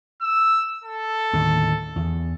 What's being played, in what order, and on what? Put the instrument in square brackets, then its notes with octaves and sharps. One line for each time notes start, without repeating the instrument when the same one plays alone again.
[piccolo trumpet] E6
A4
[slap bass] D#2 A2 D3
E2